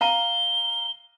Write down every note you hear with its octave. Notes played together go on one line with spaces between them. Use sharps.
F5 A#5 D#7 G7